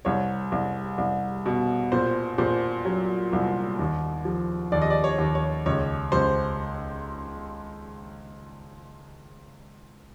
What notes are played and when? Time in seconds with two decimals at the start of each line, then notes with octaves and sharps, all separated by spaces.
0.05 C2 C#5
0.52 C2
0.98 C2
1.46 B2
1.92 A#2 C5
2.38 A#2 C5
2.85 F#3
3.33 C2
3.79 D#2
4.25 F3
4.72 D#2 D5
4.82 D#5
4.90 D5
5.04 C#5
5.18 D#2
5.35 C#5
5.66 C#2 C#5
6.12 C#2 C5